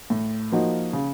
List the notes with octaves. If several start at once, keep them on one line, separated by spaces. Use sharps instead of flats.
A2
F3 A#3 D#4 F#4
C#3